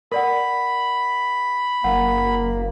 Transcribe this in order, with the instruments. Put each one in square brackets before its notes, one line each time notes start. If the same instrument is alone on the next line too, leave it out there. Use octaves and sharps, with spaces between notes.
[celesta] A#4 D5 F#5 [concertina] B5
[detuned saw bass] F#1 [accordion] A#3 [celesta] F#5